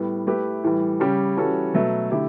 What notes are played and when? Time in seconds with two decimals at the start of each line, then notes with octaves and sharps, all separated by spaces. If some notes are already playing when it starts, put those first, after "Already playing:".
Already playing: A2 G3 B3
0.27 A3 E4 G4 B4
0.64 A2 E3 G3
1.00 C#3 G3 C#4 G4
1.37 E3 G3 C#4 F#4 A4
1.74 B2 F#3 A3
2.11 D3 A3 E4 G4